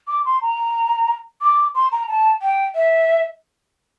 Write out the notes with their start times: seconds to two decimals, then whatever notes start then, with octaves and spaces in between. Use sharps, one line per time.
0.08 D6
0.25 C6
0.41 A#5
1.41 D6
1.74 C6
1.92 A#5
2.07 A5
2.41 G5
2.75 E5